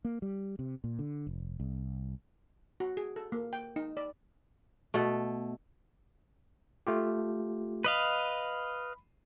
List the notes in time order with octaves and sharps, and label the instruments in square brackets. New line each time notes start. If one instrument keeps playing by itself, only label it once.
[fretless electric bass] A#3
G3
C3
A#2
D3
F1
C2
[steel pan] F#4
G#4
A4
A#3
G5
D#4
D5
[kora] B2 A3
[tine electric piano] A3 F4 G4
[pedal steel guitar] B4 D#5 F5 [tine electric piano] B5